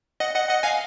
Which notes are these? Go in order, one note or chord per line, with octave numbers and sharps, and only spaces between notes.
D#5 F#5
D#5 F#5
D#5 F#5
F5 G#5